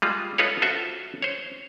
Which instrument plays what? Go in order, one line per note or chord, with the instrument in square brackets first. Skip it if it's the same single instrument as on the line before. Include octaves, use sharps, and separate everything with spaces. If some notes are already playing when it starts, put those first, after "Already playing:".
[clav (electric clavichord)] G3 G#3 F4
D#4 F4 A4 B4 C#5
F4 F#4 A4 C5 E5
C5 C#5